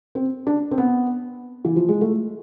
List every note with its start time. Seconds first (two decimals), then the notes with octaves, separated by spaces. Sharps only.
0.15 C4
0.47 D4
0.71 C4
0.78 B3
1.65 E3
1.76 F3
1.89 G#3
2.01 A3